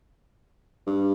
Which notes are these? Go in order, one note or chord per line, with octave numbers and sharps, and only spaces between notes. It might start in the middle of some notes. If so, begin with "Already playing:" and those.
G2